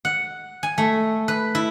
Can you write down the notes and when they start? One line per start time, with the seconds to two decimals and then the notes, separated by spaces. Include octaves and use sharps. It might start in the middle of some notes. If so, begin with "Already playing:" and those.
0.05 F#5
0.63 G#5
0.78 A3
1.28 B4
1.55 E4